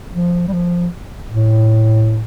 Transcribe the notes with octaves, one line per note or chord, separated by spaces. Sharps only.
F3
G3
F3
A2